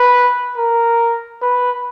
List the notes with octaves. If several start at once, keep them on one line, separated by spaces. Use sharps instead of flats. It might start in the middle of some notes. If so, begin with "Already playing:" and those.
Already playing: B4
A#4
B4